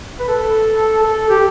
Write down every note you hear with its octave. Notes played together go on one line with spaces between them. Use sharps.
B4
A4
A4
G4